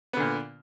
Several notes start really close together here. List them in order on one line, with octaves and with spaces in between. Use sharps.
B3 D3 A#2